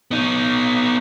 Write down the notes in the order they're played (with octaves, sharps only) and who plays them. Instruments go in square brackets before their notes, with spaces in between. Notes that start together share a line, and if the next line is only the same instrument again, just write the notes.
[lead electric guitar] B3 D#4